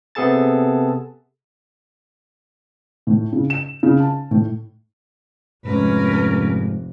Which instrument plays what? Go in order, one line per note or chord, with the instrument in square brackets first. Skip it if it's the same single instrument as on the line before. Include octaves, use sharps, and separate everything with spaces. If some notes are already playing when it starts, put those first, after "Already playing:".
[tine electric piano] C3 B3 G#4 A4 A5 A6
[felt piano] A2
C#3
E7
C#3
A5
A2
[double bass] F1 [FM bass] G#2 [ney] C#4 [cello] A#4 B4